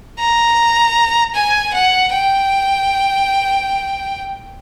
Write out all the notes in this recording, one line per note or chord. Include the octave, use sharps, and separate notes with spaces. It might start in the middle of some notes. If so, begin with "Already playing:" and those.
A#5
G#5
F#5
G5